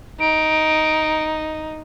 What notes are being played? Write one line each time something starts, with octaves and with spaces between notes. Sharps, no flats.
D#4 D7